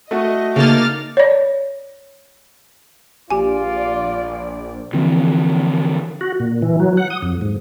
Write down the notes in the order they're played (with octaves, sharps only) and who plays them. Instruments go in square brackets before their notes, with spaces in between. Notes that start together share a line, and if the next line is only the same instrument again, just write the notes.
[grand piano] A3 F#4 [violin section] D#5
[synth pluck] C#3 A5 [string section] A#3 D#4 [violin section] D6 F6 A6
[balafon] C#5 D5
[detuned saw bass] A#1 [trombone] F4 [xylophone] G4 G#5 [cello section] D5
[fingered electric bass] D3 E3 F3 C4
[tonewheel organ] F#4
A#2
E3
F#3
F#5
D#6
F2
G#2